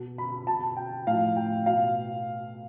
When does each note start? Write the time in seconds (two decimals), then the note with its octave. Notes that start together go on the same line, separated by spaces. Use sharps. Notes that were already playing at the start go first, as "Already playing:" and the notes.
Already playing: B2
0.18 B5
0.47 B2 A5
0.77 G5
1.07 A2 F3 F5
1.36 G5
1.66 B2 F5